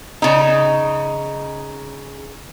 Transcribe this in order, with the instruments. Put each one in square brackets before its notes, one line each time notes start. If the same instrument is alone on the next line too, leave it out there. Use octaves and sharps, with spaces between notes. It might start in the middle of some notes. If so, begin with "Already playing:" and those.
[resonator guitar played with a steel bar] C#3 D#4